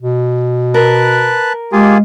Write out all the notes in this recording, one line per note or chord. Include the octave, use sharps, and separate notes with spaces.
B2
A#4 B4 A5 F#6
G#3 A#3 F4 G4 G#4